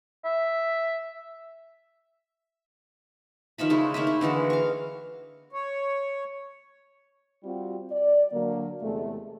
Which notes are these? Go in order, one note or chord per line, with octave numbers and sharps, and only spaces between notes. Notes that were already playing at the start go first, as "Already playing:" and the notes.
E5
D#3 F3 E5 B5
C#3 G#3 A3 E4
D#3 A3 A#3 E5
E4
D3 E3 G#3 F#4
F5 C#6
C#5
G3 C4 F4 F#4
D5
D3 F#3 A#3
E2 C3 G#3 A3